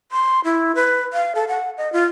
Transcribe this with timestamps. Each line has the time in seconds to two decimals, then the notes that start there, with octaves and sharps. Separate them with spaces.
0.12 C6
0.44 E4
0.75 B4
1.13 F5
1.35 A4
1.48 F#5
1.78 D#5
1.93 F4